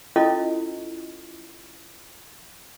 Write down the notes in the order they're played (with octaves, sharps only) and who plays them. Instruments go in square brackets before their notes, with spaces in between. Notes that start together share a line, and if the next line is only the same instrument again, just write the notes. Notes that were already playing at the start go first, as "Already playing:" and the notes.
[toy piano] C#4 E4 F4 A4 D#5